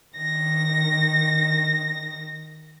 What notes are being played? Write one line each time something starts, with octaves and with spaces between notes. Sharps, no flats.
D#3 A#6